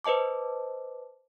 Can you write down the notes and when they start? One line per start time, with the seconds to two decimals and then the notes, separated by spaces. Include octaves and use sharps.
0.04 B4 C5 D#5 A5 D6